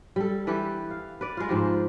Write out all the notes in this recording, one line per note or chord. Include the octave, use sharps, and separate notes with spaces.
G3 A4
E3 G4 A4 B4
F5
B4 D5
G#3 F4
G#2 F3 G4